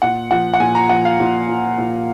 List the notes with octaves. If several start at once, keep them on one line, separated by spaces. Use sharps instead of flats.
A#2 F#5
F3 F#5
F#5
A#2 G#5
A#5
F3 F#5
F5
A#2
F3
A#2